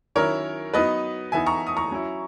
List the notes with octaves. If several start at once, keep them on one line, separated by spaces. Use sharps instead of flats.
D#3 F#3 C#4 E4 A#4 C#5
F#3 B3 D#4 B4 D#5
E3 B3 D#4 E5 G#5
A#5 C#6
D#6
A#5 C#6
F#3 C#4 E4